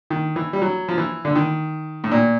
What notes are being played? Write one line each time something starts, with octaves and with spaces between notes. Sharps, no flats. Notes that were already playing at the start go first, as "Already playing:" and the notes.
D#3
E3
G3
F#3
F3
E3
D3
D#3
A2
A#2